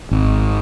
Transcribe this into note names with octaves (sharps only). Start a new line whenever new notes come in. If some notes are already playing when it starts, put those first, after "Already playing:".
G#1